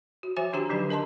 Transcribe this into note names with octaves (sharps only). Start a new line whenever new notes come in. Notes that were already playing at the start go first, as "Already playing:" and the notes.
F#4
F3 F#4 C5 E5 G#5
D#3 D4 F#4 G4 G5 A#5
D3 F#3 D#4 G4 B4
D4 A#4 D#5 A5 A#5 C6